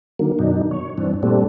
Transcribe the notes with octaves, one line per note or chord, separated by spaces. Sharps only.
D3 D#3 F#3 A#3
F#2 B2 D#3 F#3 D4 D#4
C#5
G2 E3 C4 D4
A#2 G3 A3 C4 D4